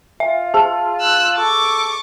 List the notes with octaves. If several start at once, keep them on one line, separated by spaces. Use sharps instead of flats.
F4 E5
G#4 A5
E6 F#6
A4 C#6 D6